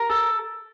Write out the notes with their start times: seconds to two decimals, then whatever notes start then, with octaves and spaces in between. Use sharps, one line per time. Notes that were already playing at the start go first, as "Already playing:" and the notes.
Already playing: A#4
0.10 A4